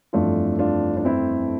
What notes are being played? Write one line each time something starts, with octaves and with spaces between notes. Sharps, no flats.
G1 F2 E3 A3 D4 F4
D4 F4
D4
C4 E4